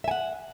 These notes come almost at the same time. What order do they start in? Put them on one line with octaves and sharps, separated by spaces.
E5 G#5 F#5